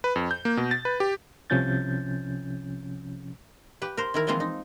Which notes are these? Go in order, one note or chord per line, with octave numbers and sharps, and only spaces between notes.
B4
F2
G6
A#3
B2
A6
B4
G4
C2 C3 F3 C#4 G6 A6
G4 B4
A#4 C5
D#3 E4 A#4
E3 F3 G#3 A#3 C4 F4
D#4